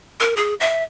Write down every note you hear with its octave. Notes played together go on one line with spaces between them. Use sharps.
A#4
G#4
E5